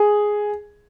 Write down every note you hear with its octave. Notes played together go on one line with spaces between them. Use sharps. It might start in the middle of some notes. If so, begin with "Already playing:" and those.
Already playing: G#4